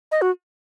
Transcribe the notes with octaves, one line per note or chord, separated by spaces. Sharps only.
D#5
F#4